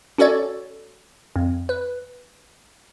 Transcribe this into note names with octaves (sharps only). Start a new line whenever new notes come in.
C#4 F#4 A4 C#5 D5
F2
B4